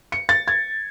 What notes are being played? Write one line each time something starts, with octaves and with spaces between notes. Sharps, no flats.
C#7
A6
G#6